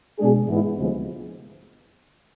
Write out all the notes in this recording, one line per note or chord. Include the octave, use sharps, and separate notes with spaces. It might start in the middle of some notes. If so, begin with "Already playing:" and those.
B2 G#3 D4 G#4
G#2 E3 G#3 B3 E4
D2 C3 F3 G#3 B3